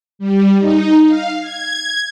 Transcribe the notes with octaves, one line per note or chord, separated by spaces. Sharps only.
G3
D#4
F5
G#6